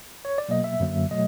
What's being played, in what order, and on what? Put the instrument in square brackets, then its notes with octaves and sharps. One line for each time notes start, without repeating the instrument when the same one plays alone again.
[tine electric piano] C#5
D5
B2 F#3 A#3 D#5
E5
F#2 D3 F#3 A#3
B2 F#3 A3 D#5